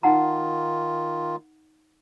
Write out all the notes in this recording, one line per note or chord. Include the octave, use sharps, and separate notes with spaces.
D#3 D#4 F4 F#5 A#5